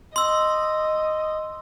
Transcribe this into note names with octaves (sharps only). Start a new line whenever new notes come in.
D#5 C6 E6